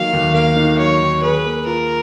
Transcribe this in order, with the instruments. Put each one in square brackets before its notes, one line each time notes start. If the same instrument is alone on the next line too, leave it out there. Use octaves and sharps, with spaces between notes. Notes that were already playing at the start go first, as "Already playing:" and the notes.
Already playing: [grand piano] D#3 F#3 A#3 [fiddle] F5
[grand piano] D#2
[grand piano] A#3 [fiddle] F5
[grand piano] D#3
[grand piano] F#3 [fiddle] C#5
[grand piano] D#2
[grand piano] G#4 [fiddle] B4
[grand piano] A#3
[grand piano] F4 [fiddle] A#4